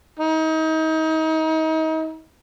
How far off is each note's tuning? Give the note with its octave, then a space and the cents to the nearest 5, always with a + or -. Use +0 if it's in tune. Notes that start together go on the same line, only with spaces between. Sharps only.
D#4 +35